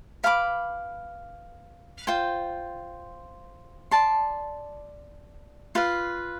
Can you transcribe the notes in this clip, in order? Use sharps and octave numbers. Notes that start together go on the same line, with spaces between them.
B4 F5 B5 D6
F4 C5 G5
D5 A5 C6
F4 B4 F5